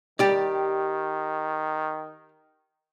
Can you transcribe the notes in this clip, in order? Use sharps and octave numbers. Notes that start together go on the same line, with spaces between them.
D#3 G4 D5